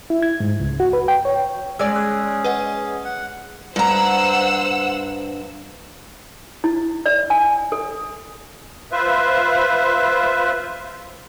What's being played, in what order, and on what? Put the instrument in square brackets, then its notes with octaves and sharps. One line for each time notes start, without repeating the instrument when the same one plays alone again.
[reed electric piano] E4
G#6
G#2
C#2
F#4
B4
G5
C#5
[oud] G#3 D5 [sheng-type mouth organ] C#4 G#4 [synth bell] E6
[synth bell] E6 F#6
B4 D#5 F#5
[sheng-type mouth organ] F#5
[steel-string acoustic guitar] G2 A#5 [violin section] C5 F#5 E6
[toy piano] E4
D5
G#5
A4
[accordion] F4 B4 C5 E5